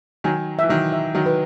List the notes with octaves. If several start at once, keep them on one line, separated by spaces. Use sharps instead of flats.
D#3 F#3 G#5
E3 E5
D#3 F#3
E5
D#3 F#3
B4